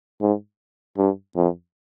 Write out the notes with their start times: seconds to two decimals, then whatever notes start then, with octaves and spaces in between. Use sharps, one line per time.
0.21 G#2
0.98 G2
1.36 F2